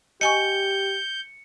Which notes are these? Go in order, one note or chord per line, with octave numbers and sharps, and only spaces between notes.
G4 D#5 G#5 C#6 G6 C#7